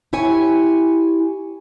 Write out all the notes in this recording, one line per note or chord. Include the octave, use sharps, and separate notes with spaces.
E4 G4 C#5 G#5